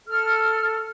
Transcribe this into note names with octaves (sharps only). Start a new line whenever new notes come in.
A4 F6